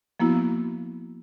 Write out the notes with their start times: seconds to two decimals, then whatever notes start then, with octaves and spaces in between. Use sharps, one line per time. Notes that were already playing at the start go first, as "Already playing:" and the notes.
0.20 F3 A#3 B3 E4 F#4